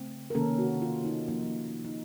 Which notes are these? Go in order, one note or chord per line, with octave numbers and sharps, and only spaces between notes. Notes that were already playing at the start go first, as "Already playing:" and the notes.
Already playing: C#3 A3 C4
A#4
C3 D#3 A#3 C#4 A4
F#4
F4
D#4
A#2 F3 A#3 C#4 D#4
D#4